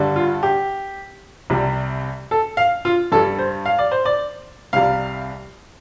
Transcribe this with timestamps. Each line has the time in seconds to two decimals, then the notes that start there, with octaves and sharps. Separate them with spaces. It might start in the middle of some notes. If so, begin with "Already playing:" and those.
Already playing: G2 D3 G3
0.16 F4
0.43 G4
1.50 C2 C3 G3
2.31 A4
2.57 F5
2.85 F4
3.12 G2 G3 A4
3.38 C5
3.66 F5
3.79 D5
3.91 C5
4.05 D5
4.73 C2 C3 G3 F5